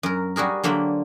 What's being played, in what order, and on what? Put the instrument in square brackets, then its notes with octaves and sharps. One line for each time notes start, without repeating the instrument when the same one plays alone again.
[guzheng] F#2 A#4
G3 F#4 G#4 A#4
D3 F#3 A#3 C5 B5